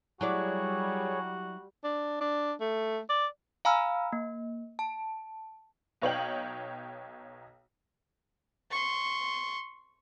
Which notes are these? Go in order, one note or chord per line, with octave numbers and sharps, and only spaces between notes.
F#3 G3 E4 F#4 G#4 C#5 D5
D4
D4
A3
D5
F5 G#5 A#5 B5 E6 F6
A#3
A5
B1 D#4 C#5 F5 G5 F#7
C6 C#6